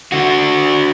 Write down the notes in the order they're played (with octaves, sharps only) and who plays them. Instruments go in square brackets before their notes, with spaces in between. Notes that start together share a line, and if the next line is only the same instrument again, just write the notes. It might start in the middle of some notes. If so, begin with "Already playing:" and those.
[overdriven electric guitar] D3 F#4